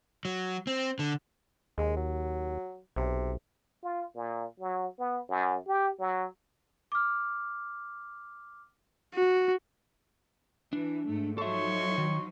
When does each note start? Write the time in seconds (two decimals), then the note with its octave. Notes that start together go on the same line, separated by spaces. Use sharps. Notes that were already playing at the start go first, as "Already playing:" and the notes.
0.25 F#3
0.67 C4
0.99 D3
1.78 D#2 G#3
1.97 F#3
2.96 B1 C3
3.83 F4
4.16 A#2
4.60 F#3
4.99 B3
5.29 F#2
5.67 G4
6.00 F#3
6.92 D6 F6
9.14 F#4
10.73 E3 D4
11.06 G#2 A3
11.38 F3 F#3 D#4 A4 C#5 E5 C6 C#6
11.98 D#3